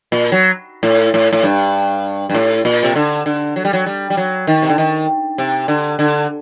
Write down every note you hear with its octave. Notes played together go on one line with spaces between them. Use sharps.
A#2
F#3
A2
A2
A2
G2
G2
A2
A#2
C3
D3
D3
F#3
G3
F#3
G3
G3
F#3
D#3
C3
D3
D#3
C3
D3
D3